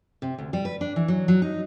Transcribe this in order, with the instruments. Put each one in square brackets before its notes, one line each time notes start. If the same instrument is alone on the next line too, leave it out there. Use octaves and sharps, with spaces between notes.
[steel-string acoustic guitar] C3
D2
G3
B4
D4
E3
F#3
F#3
D#4